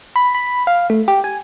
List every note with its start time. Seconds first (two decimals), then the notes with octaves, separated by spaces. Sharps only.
0.16 B5
0.35 B5
0.67 F5
0.90 A3
1.08 G4
1.24 G#5